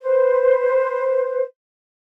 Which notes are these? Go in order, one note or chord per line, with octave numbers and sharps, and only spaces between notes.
B4 C5